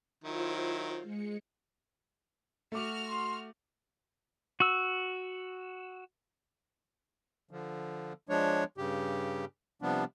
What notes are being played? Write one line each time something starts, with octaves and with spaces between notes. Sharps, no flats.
D#3 F#3 E4 F4 C5
G#3 C#7
A3 F#4 D6 F6
C6
F#4 E6
D3 F3
F3 G#3 D4 C#5
G2 C#3 G4
C3 F3 G3 B3 D4